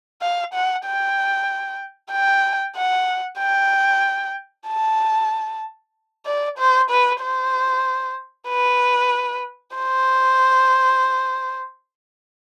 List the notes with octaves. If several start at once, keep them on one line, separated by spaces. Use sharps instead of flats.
F5
F#5
G5
G5
F#5
G5
A5
D5
C5
B4
C5
B4
C5